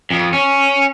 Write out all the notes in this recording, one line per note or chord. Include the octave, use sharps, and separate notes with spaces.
F2
C#4